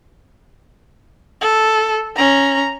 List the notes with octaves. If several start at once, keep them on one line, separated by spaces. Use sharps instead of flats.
A4
C#4 A#5